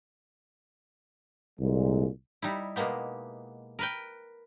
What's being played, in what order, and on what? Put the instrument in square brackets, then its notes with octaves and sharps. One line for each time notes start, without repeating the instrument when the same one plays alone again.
[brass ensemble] C2 A#2 G#3
[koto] G3 D#4 E4
B2 G#3 A#3 B3 G4
A#4 B4 G5